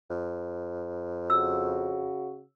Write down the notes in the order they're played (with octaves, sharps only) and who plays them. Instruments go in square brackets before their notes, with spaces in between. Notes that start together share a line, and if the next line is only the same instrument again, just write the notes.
[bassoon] F2
[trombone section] C#3 F#4 [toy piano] E6